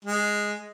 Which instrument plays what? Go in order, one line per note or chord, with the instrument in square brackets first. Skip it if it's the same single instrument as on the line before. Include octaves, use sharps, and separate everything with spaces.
[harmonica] G#3